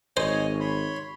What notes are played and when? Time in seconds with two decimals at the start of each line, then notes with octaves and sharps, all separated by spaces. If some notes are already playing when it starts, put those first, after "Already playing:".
0.17 G#1 C5 C#5 D#5 G#5
0.60 C#5 B5 C6